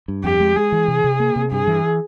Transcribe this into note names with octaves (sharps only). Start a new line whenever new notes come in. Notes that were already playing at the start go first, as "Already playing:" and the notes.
G2
F2 G4
G#3
G#3 G#4
E3
C3
C3
A#3
C3
G2 G#4
E3